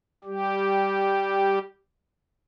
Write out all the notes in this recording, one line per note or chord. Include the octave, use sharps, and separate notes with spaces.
G3 G4